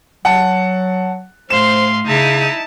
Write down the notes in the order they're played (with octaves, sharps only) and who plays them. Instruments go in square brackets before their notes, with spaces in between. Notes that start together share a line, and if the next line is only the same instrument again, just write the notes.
[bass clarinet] F#3 [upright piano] F#5 A5
[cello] A2 [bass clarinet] C5 [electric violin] F5 C6 [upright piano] E7
[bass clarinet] C#3 [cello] D#4 E4 [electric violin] A5